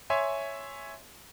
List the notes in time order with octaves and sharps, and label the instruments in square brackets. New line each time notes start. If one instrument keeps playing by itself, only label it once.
[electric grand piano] C#5 E5 G#5 C6